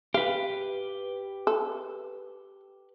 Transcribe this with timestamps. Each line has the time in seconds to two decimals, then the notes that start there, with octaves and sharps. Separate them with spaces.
0.14 G4 B4 F5
1.47 A4